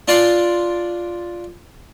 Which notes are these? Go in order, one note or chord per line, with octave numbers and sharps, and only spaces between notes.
D4 F4 D5 A5 C6